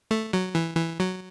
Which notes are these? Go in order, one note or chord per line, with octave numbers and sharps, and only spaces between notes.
A3
F#3
E3
E3
F#3